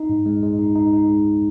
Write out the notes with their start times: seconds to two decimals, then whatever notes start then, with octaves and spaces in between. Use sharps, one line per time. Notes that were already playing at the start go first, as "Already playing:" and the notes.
Already playing: D#4
0.09 G#2
0.26 G#3
0.43 G#3
0.59 D#4
0.75 D#4
0.93 D#4
1.09 G#3